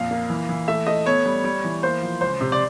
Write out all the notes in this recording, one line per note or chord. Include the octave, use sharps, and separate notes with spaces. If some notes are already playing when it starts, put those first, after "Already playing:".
Already playing: F2 A#2 F5
A#3
E3
E3
A3 E5
A3 D#5
B3 C#5
G3
G3
E3
A#3 C5
F3
C#2 C5
C3
D5